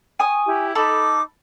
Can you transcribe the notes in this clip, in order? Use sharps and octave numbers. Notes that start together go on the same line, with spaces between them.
G#5 C#6 D#6
E4 G4
D#4 A4 A5 B5 D6